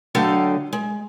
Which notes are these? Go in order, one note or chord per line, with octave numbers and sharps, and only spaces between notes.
D3 F#3 A3 D#5 F5 G5
G#3